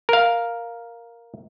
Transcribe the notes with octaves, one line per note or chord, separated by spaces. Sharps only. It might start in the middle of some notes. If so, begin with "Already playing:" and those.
A#4 F5